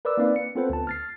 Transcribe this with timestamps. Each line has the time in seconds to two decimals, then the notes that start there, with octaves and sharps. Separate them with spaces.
0.05 A#4 B4 D5 D6 E6
0.17 A#3 C4 D#4 B4 D5 F5
0.36 C#7
0.55 B3 C4 F4 A4 B4 C5
0.70 D2 A5
0.87 F6 A6 C7